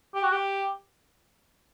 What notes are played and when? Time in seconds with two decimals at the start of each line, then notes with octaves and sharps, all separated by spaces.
0.15 G4
0.23 F#4
0.32 G4